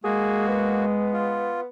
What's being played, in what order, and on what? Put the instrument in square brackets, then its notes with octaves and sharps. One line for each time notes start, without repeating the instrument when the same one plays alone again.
[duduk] G#3 [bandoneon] A#3 F#4 [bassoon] G#4
[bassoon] B3
[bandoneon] F4